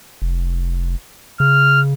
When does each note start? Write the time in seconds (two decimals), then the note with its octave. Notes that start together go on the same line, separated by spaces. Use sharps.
0.22 F1
1.40 C#3 F6